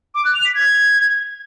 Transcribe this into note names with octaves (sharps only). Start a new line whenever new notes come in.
D6
F#6
F7
B6
G#6